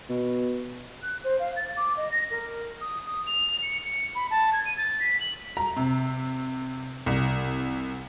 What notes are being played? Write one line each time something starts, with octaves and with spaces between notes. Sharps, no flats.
B2
F#6
C5
F5
A6
D6
D#5
A#6
A#4
D#6
D#6
F7
C#7
C#7
B5
A5
G#6
D#7
A6
B6
F#7
A#5
C3
C2